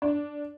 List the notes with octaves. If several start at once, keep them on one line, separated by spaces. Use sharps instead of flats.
D4